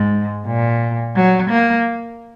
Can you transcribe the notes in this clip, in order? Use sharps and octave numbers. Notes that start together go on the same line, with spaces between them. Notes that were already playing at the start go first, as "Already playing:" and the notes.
Already playing: G#2
A#2
F#3
A#3